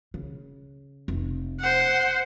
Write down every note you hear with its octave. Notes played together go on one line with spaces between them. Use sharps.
C#3
F1
C5 F#5